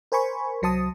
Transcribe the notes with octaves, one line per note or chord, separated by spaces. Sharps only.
A#4 C5 G#5 B5 C#6
C2 F#3 C5 A5 D#6